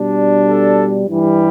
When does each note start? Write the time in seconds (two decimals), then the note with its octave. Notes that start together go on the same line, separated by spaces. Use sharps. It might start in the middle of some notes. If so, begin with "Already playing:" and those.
Already playing: B2 G3 D4
0.47 A4
1.08 G2 E3 G3